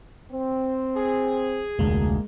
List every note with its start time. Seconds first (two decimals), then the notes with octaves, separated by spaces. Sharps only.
0.32 C4
0.97 G#4
1.79 F1 D2 G#3 A#3